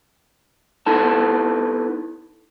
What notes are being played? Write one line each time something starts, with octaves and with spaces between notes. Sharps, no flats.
B3 D#4 E4 A4 A5